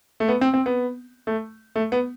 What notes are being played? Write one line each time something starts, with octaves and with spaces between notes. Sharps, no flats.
A3
B3
C4
C4
B3
A3
A3
B3